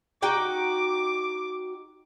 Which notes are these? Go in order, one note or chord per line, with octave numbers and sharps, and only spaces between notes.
D#4 F#4 G5 D6